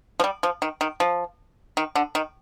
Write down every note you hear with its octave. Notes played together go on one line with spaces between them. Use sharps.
F3
G3
F3
D#3
D#3
F3
D#3
D3
D#3